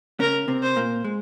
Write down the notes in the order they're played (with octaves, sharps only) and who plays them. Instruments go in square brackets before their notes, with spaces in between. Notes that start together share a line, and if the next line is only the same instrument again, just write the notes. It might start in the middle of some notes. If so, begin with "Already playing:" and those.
[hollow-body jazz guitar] C#3 C#4 [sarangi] A#4
[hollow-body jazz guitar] C3 C4
[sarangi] C5
[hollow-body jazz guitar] A#2 A#3
G#3